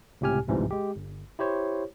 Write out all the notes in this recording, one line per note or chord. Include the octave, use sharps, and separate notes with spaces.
C#2 A2 C3 G4 G#5 F6
A1 D2 G#2 C3 E3 F3
G#3 G4
G1
E4 G4 C5 C#5